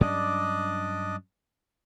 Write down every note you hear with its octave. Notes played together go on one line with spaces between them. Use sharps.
G2 F#3 C#4 D4 D5 D#5